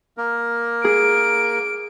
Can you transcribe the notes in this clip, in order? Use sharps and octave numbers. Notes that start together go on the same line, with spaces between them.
A#3 A#4
G#4 D7